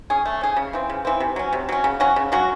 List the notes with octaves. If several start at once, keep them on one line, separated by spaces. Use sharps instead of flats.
C#4 G#4
A3
C#4 G#4
C#3
E3 C4
C#3
E3 C4
C3
F#3 C#4
C3
F#3 C#4
C#3
F#3 C#4 F#4
C#3
F#3 C#4 F#4